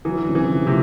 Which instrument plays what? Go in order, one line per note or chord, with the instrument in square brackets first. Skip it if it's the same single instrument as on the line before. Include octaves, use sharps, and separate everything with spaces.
[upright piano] E3 [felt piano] F#3
[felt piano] D3
C3
[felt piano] C#3 [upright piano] E3
[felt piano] F3
[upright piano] C3 [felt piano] A3